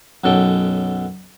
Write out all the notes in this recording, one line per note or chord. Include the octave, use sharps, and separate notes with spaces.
B1 F#2 B2 A4 G5